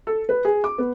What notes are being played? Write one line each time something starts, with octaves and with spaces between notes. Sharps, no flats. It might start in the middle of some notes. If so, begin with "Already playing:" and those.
A4
B4
G#4
D6
B3